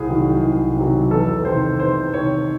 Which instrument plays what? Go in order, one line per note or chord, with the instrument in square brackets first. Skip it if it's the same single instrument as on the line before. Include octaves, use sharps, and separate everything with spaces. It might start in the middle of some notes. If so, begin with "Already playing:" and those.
Already playing: [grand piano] C2 G#4
C3 D#3 F#3
C2
C3 D#3 F#3
E2 A4
C3 D#3 C5
E2 C5
C3 D#3 C#5